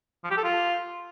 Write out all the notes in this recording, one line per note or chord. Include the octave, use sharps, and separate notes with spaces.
F3
G4
A4
F4